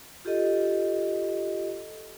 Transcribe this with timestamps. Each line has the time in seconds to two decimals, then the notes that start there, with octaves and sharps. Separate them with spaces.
0.25 F4 G4 A4 D#5